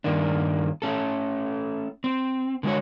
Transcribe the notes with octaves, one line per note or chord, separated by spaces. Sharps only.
G2 D#3 A#3 D4
A3 C#4 A4
C4
D3 G#3 F#4 C#5